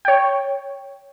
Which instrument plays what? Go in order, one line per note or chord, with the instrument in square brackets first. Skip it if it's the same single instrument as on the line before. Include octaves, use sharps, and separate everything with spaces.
[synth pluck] C#5 G5